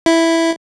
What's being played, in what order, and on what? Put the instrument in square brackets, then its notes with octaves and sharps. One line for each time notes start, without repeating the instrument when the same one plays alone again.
[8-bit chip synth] E4